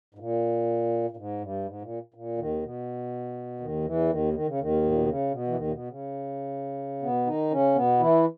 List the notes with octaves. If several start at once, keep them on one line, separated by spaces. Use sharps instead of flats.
G#2
A#2
A#2
G#2
G2
G#2
A#2
A#2
D#2 D#3
B2
D#2 D#3
E2 E3
D#2 D#3
D#3
C#3
D#2 D#3
G#2
A#2
B2
C#3
B2
E3
D#2 D#3
A#2
B2
C#3
B2 B3
D#3 D#4
C#3 C#4
B2 B3
E3 E4